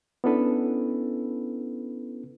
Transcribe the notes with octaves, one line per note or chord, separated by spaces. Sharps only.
B3 C#4 D4 E4 A4 B4